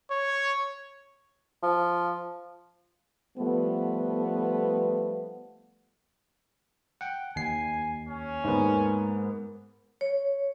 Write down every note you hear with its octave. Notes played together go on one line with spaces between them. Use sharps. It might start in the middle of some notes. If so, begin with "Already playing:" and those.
C#5
F3
F3 G3 A3 B3
F#5 G5
D#2 G#5 C7
C#4
G#2 A#3 B3
C#5